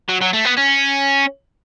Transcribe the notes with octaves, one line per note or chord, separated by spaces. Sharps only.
F#3
F#3
A3
B3
C#4